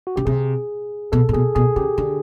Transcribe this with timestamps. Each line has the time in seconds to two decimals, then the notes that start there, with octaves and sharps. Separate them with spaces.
0.07 F#4
0.16 C#3 G4
0.26 C3 G#4
1.12 B2 A4
1.29 A#2
1.33 B2 G#4
1.55 B2 G#4
1.76 C#3 G4
1.98 D3